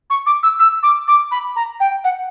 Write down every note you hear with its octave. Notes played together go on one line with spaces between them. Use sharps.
C#6
D6
E6
E6
D6
D6
B5
A#5
G5
F#5